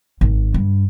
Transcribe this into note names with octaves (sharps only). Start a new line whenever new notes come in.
G#1
G2